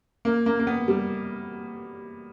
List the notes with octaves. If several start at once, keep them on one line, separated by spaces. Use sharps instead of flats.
A#3
A#3
A#3
B3
G3